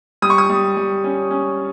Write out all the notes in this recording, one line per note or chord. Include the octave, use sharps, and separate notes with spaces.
G3 D#6
C#6
D#6
G3
G3
C#4
C#4